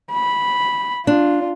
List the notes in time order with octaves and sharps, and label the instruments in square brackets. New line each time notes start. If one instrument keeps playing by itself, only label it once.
[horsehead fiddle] B5
[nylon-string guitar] D4 [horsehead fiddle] F4